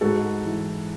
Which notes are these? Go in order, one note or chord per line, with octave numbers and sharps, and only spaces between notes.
G#2 F#4 A4
E3